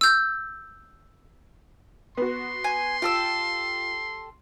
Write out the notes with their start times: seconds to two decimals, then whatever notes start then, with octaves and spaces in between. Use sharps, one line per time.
0.01 E6 G6
2.17 B3 F#4 C6
2.64 G#5
3.02 F4 G4 A4 E6